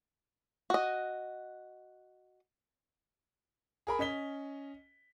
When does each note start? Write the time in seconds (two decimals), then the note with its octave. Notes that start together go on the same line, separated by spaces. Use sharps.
0.70 F#4 D#5
3.87 G#4 A#4 B5
3.99 C#4 D#5 B6 G7